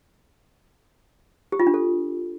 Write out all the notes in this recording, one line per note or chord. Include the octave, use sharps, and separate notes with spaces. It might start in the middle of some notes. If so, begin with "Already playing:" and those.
G4
F4
D4
A4